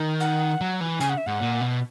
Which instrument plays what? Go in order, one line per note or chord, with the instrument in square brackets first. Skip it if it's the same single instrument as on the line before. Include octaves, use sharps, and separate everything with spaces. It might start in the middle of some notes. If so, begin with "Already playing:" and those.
Already playing: [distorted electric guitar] D#3
[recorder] F#5
[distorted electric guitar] F#3
E3
[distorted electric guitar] C#3 [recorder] G#5
[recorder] F#5
E5
[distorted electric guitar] G#2 [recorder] F#5
[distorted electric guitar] A#2
B2